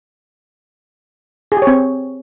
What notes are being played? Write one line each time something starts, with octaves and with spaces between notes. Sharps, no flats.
G#4
G4
C#5
C4